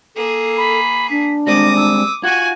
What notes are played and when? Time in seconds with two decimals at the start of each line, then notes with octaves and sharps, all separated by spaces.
0.16 A#3 G#4 A4
0.57 B5
1.10 D4 B6
1.47 G3 G#3 C4 D6 D#6 A#6
1.77 E6
2.23 F4 F#4 F#5 G#5 G#6